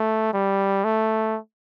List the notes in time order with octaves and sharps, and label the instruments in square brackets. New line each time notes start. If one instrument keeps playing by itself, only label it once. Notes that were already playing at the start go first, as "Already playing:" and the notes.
Already playing: [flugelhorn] A3
G3
A3